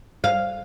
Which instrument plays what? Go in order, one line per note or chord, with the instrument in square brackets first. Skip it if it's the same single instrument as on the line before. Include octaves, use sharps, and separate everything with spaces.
[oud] F5